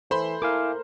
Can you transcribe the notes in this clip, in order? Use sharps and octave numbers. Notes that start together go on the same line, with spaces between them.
E3 A4 C5 B5 C6
E4 A#4 F5 G#5 D6